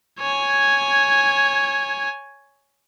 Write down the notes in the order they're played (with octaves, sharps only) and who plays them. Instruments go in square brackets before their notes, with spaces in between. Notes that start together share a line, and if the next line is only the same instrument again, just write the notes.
[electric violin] C#5 G#5